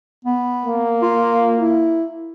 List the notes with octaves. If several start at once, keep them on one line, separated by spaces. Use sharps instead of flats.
B3
A#3
F4
E4